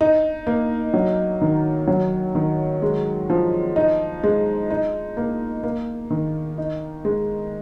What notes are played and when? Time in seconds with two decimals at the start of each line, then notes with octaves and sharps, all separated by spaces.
0.01 D#4
0.47 A#3
0.94 F#3
1.41 D#3
1.87 F#3
2.35 D#3
2.82 G#3
3.30 F3
3.76 D#4
4.24 G#3
4.70 D#4
5.17 A#3
5.63 A#3
6.11 D#3
6.58 D#4
7.05 G#3